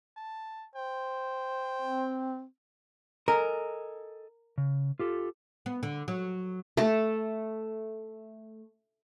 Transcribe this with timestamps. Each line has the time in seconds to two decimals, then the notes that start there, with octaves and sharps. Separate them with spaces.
0.17 A5
0.76 C5 G5
1.82 C4
3.28 A4 A#4 D#5 G#5
4.58 C#3
4.99 F4 G4 A4
5.66 B3
5.83 D3
6.08 F#3
6.77 A3 A4